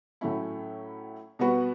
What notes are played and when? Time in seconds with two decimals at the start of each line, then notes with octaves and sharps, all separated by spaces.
0.21 A2 F#3 A3 C#4 E4
1.39 B2 G3 B3 F#4 B4